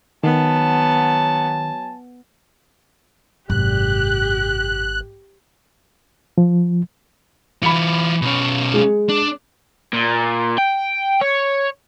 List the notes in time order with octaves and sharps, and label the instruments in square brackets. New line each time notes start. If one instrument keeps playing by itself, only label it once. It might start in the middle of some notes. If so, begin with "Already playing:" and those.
[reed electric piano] D#3 [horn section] F#3 G#5 A5 [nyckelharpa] B3
[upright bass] G#1 [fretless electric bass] F#2 C3 [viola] G4 [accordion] F#6
[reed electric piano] F3
[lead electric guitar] E3 F4 [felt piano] B5 C#7
[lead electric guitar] B2 C#4
[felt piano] G#3 G#4
[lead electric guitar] D4
[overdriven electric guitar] A#2
G5
C#5